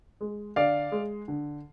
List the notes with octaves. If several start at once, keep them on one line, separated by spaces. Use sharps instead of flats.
G#3
D3 D5 F5
G#3
D3